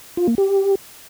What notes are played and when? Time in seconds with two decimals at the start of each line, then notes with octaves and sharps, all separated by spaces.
0.17 F4
0.28 A#3
0.38 G4